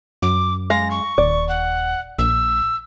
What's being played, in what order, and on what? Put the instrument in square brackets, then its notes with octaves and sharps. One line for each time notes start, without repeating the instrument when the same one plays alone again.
[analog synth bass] F#2 [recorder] D6
[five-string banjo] G#3 F5 [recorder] A#6
[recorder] C#6
[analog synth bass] D#1 [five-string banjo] D5
[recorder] F#5
[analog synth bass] A#1 [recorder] E6